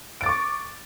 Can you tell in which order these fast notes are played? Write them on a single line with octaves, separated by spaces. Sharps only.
D7 A6 D6 C#6